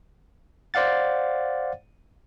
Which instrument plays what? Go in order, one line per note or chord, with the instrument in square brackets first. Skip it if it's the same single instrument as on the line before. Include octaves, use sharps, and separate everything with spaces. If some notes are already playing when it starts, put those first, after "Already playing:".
[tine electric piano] C5 D5 F5 F#5 A6